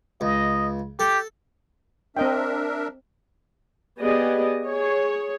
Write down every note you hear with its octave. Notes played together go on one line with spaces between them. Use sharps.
C#2 D#5
G4 A4
C4 D4 A#4 D#5 E5 G5
B3 G4 G#4 D5 D#5
G#4 C#5